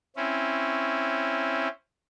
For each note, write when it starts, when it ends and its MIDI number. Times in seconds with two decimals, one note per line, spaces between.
0.17 1.68 60
0.17 1.68 61
0.17 1.68 64